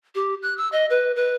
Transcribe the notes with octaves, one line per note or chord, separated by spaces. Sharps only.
G4
F#6
E6
D#5
B4
B4